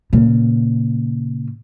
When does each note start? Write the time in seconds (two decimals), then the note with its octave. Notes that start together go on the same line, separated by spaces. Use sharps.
0.13 A#2 C#3